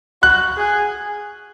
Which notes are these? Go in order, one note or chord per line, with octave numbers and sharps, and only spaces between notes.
F#4 F#6
G#4